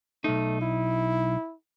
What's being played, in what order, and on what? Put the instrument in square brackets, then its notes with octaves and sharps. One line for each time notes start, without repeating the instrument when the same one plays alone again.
[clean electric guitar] B1 D#4 [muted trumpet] A3
[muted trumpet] E4